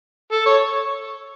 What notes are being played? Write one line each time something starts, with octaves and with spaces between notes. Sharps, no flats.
A4
C#5